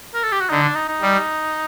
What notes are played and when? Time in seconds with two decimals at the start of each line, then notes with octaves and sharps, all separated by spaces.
0.15 A#4
0.24 A4
0.32 G4
0.41 F#4
0.50 D3 D#4
0.63 D4
0.76 D#4
0.89 D#4
1.01 G3